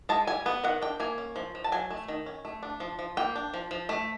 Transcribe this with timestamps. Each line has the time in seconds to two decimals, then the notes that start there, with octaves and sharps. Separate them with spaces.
0.09 G#3 A5
0.27 G3 G#5
0.46 B3
0.64 D#3 F#5
0.81 D4 G5
1.00 A#3 G#5
1.18 C#4
1.36 F3
1.55 F3
1.64 A5
1.72 F#3 G#5
1.90 A3
2.08 D#3
2.26 C#4
2.45 A3
2.63 D4
2.80 F3
2.99 F3
3.17 A#3 G5
3.36 D4
3.54 F3
3.71 F3
3.89 A3